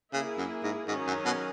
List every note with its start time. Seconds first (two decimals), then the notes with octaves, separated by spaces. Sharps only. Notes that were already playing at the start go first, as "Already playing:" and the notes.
0.13 C#3 A#3 E4 G#4
0.38 F#2
0.63 G#2
0.88 G#2 D#3 F#3 C#4 G#4
1.07 F#2
1.25 B2